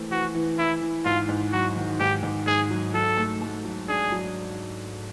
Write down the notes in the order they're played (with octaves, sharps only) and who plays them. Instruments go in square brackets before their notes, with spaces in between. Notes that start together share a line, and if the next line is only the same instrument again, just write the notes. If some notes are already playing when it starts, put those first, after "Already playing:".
Already playing: [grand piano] E3 A3 C4
[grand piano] E3 [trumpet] F#4
[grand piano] E3
[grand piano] E3 [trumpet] E4
[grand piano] E3
[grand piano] G#2 [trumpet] F4
[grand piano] G#2
[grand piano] F#3 [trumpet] F#4
[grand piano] D#3
[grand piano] G#2 [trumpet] G4
[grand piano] G#2
[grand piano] G#2 [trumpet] G#4
[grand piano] F#3
[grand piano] F#3 [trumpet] A4
[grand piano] A3
A3
F#3
[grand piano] D4 [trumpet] G#4
[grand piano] F#3